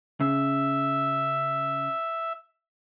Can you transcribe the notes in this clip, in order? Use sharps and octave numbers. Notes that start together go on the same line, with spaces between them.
C#3 E5